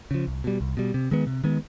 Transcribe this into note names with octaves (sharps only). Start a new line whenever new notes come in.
C#3 F3
C2
B2 G3
C2
B2 G3
C3
D#3 G#3 B3
C3
D#3 G#3 B3